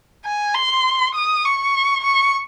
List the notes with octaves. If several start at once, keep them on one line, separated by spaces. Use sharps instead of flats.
G#5
C6
D#6
C#6
C#6